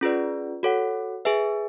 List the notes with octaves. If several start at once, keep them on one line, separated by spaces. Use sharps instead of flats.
C#4 F4 G#4 B4 D5
F#4 A4 C#5 F#5
G#4 B4 E5 G#5